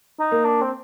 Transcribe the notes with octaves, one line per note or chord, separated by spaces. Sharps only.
D#4
A#3
D4
C4